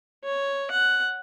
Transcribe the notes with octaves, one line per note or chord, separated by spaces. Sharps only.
C#5
F#5